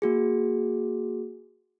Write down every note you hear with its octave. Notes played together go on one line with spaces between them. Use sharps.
A#3 F#4 G#4